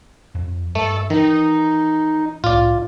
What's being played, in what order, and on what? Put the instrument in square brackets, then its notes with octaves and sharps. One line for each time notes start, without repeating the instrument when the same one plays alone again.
[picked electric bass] F2
[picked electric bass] G2 [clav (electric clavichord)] A3 [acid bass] A4
[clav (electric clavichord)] D#3 [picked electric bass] E3 [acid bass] D#4
[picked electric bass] C2 A2 [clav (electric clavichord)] F4 D5